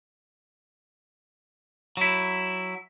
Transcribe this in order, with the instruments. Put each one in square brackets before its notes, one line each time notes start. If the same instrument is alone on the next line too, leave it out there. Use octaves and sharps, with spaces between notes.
[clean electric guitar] F#3 E4